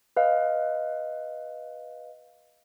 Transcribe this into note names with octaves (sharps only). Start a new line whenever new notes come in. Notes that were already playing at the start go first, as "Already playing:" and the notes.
B4 D#5 F5